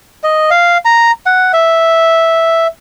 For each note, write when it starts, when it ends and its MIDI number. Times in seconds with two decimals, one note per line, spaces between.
0.24 0.50 75
0.51 0.78 77
0.85 1.11 82
1.26 1.52 78
1.53 2.67 76